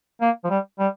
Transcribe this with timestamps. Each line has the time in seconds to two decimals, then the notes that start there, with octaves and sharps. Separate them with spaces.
0.21 A#3
0.44 F3
0.50 G3
0.79 G3